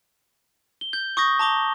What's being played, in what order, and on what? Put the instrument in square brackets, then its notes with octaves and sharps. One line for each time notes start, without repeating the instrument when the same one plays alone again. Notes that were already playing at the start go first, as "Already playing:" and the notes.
[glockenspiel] G7
G6
C#6 D#6 G6 A#6
A5 A#5 D6 G7